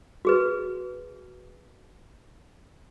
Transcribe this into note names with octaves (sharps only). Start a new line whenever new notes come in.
F#4 G#4 B4